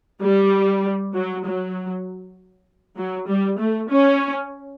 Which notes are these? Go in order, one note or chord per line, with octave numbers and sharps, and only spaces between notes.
G3
F#3
F#3
F#3
G3
A3
C#4